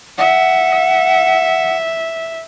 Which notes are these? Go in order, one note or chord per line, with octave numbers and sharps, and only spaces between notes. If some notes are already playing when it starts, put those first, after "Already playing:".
E5 F#5